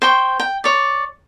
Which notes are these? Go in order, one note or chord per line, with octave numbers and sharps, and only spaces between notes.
C5 G5 C#6
G5
C#5 D5